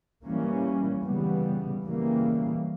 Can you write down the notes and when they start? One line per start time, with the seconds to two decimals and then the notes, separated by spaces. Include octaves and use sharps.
0.23 E3 G3 A#3 C#4
1.04 C#3 E3 G3 B3
1.85 C#3 E3 G3 A#3